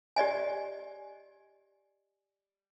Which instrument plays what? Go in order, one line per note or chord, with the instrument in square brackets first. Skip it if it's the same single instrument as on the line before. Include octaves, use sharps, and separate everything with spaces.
[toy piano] G4 D5 D#5 G#5